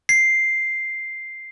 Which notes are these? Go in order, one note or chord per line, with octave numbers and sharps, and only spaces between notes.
C7